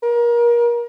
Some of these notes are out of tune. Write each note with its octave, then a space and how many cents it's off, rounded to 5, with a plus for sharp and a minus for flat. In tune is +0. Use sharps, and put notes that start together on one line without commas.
A#4 +30